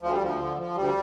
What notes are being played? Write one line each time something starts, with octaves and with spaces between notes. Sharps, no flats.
D2 F3
G3
D2 F3
D3
F3
D2 G3